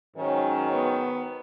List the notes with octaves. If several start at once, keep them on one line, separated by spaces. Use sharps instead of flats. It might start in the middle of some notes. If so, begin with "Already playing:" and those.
G#2 D#3 F#3 C#4
B3